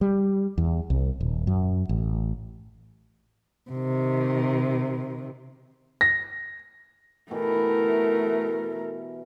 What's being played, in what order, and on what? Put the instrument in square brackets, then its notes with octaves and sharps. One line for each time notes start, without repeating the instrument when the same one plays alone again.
[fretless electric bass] G3
E2
C2
D#1
F#2
A1
[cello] C3 D#3
[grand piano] A#6
[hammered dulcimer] B2 E3 G4 [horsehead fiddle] A3 A#4